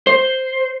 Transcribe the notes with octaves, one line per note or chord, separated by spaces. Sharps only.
C5